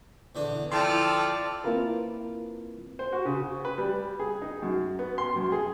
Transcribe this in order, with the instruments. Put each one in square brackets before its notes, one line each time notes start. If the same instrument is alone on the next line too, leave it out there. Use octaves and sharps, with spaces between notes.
[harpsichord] E2 D3 D4
[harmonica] F3 C4 A4 [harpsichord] E4 [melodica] D5 [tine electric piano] A5 C6
[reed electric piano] A#3 C4 E4 F4 A#4 B4
[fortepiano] C5
F#4
C#3
B4
G3
G#4
D#4
F#2
B3
C6
F#2
G#4